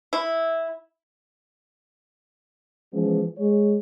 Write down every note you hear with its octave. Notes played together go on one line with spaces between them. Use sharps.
E4
E3 F3 G#3 B3 C#4
G#3 C#5